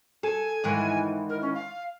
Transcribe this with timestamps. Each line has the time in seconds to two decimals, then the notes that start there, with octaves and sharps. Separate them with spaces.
0.23 A4 G#5
0.64 G#2 D#3 E3
1.29 A#4
1.42 C#4
1.54 F5